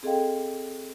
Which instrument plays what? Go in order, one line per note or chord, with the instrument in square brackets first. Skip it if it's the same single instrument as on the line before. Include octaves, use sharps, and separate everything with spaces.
[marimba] C4 G#4 A4 D#5 F5 G5